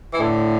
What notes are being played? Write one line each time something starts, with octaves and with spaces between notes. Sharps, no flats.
E3
A2 D3